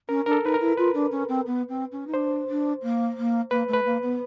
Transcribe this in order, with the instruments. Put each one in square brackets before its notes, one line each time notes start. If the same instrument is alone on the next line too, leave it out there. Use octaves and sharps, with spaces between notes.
[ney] C#4 [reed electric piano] A#4
[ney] D4 [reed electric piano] A#4
[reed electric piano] A4
[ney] D#4 [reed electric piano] B4
[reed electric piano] A#4
[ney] E4
[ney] F4 [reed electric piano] B4
[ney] D4
C#4
C4
B3
C4
C#4
D#4
[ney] D4 [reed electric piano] C5
[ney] D4
A#3
A#3
[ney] A#3 [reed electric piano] B4
[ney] A3
[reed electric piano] B4
[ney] A#3
B3